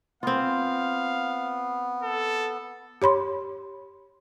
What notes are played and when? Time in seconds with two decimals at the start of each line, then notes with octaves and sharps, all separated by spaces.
0.23 B3 C4 F4 F5
2.02 A4
3.02 G4 C#5 B5 C6